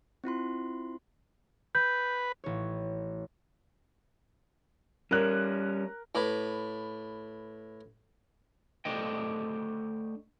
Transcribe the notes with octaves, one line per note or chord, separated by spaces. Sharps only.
C4 E4 F4 C6
B4 G6
A1 C#5
G3 C#4 A#4 F#6
A2 B4 D6
A3 D4 C5 D#5 G5